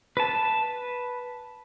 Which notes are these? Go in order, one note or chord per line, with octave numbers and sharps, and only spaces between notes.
B4 A5